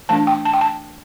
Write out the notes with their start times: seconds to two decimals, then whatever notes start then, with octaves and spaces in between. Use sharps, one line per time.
0.09 E3 A3 D4 A5
0.27 G5
0.45 A5
0.54 G5
0.61 A5